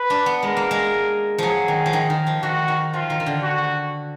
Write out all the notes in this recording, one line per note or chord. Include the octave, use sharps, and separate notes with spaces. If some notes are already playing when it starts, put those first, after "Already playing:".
Already playing: B4
D4
B3
G#3 A#4
A#3
G#3
F3 F#3 G#4
D#3
F3
D#3
D#3
F3
D#3 F#4
D#3
F3 F4
D#3
D#3
D3
F#4